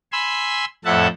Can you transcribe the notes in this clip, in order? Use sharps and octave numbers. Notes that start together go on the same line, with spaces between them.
G#5 B5 C6 E6
F2 A2 A4 E5 F#5 A5